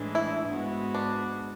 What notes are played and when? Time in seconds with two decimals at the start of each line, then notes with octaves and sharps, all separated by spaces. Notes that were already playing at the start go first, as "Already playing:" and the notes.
Already playing: A2 E3 G#3 D4
0.15 E4
0.49 G#2 G#3 B3 F#4
0.94 D4